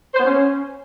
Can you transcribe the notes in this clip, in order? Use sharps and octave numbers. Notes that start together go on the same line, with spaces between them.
C5
B3
C#4